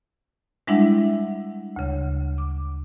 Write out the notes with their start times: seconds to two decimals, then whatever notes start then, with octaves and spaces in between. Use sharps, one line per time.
0.67 G3 G#3 D4 E4 E5 F#5
1.76 D2 C#3
2.38 D6